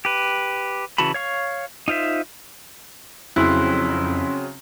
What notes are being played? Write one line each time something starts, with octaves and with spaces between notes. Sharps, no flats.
G4 B4
C#3 E3 F#4 A5 B5
C#5 F5 C#6
D#4 F4 C5 E5
F2 C#3 F#3 C4 C#4 E4 C6 F#6